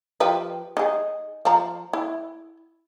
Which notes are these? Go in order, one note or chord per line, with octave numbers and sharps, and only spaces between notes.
F3 G4 B4
D#4 G#4
F3 A#5
E4